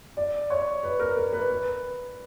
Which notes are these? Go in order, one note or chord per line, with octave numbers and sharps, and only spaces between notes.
D5
C#5
B4
A#4
A#4
B4
B4